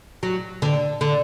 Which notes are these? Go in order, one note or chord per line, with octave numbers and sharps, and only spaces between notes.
F#3
D3
D3